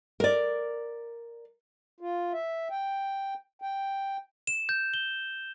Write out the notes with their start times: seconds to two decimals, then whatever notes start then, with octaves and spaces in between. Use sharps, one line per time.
0.20 A#4 D5
2.00 F4
2.33 E5
2.70 G5
3.62 G5
4.47 E7
4.69 G6
4.94 G7